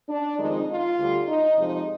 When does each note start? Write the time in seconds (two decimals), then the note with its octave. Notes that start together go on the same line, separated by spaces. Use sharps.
0.08 D4
0.38 F2 D#3 G#3 D#4
0.69 F4
0.98 D2 D3 G3
1.28 D#4
1.57 F2 C3 F3 G#3 D#4